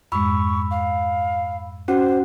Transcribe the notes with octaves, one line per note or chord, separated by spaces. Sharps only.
F2 G#2 G#3 B5 C#6 E6
F5
C#4 F#4 C5 F#5